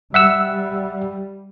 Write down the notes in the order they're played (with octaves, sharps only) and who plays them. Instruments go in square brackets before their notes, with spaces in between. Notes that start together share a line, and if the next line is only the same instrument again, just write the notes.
[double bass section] G3 [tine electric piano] E5 F#5 E6